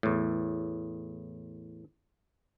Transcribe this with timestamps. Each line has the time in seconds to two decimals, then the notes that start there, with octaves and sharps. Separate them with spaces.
0.03 E2 A2